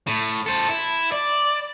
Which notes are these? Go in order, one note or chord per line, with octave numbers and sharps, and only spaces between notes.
A2
A4 C5
E4
D5